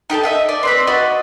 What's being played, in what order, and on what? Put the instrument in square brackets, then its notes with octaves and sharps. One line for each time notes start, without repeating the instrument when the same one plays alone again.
[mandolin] D#4 G4 A4 A5
D#5 E5 F#5
D5
C4 B4 B5
F#4 D5 D#5